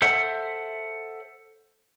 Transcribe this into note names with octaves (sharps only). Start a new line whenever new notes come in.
A4 C5 E5 F#5